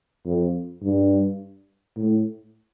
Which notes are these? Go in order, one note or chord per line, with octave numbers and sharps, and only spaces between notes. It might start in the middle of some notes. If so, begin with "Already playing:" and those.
F2
G2
A2